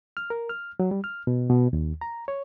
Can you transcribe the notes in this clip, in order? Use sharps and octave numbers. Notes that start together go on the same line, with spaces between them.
F6
A#4
F6
F#3
G3
F6
B2
B2
D#2
A#5
C#5